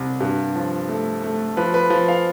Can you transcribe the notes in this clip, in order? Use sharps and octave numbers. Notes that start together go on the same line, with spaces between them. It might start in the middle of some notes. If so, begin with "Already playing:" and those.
Already playing: C2
G2
F3
A3
A3
F3 B4
B4
F3
F5